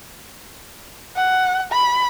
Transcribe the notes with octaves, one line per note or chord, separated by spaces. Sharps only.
F#5
B5